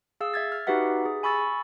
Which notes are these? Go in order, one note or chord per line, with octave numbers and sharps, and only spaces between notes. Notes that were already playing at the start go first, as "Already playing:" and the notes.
G#4 F5 E6
E5 G#6 A6
F6
D#4 F#4 G4 B4 E5 F#5
G#4
G#5 B5 C#6 E6 A6